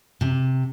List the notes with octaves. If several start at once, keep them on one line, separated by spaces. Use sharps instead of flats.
C3